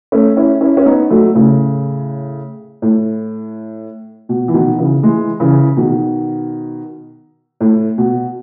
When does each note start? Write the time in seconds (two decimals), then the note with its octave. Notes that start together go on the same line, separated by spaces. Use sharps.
0.12 A3 C#4
0.37 C#4 E4
0.61 C#4 E4
0.77 C#4
0.86 B3 D#4
1.10 F#3 A3
1.35 A2 C#3
2.82 A2
4.29 B2
4.48 E3
4.54 B2 D#3
4.79 C#3 E3
5.03 E3 G#3
5.40 C#3 E3
5.77 B2 D#3
7.61 A2
7.98 B2